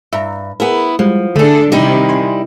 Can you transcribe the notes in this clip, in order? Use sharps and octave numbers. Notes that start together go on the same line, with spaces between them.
G2 E5 A#5
B3 E4 G#4 A#4
F3 G3 G#3
D3 A3 D4 G#4 A4
C3 D#3 G3 D#4 E4
G#5 C6